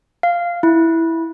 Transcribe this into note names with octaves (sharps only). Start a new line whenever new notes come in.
F5
E4